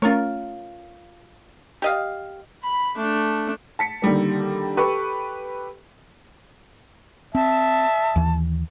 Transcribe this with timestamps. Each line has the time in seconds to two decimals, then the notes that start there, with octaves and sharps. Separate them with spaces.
0.02 A3 C#4 F4 A#4 C#5
1.82 G4 D#5 F5
2.64 B5
2.96 A3 D4
3.79 A5 B6 C#7
4.02 D3 D#3 G3 A#3
4.77 G4 A4 B4 C#6
7.35 C4 E5 A5
8.16 D#2 E3